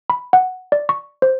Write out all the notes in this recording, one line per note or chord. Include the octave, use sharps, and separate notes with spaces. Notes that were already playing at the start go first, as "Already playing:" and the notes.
B5
F#5
D5
C#6
C5